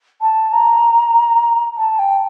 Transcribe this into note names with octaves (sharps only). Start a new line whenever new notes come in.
A5
A#5
A5
G5